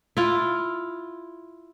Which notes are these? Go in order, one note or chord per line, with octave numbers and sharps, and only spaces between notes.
E4 F4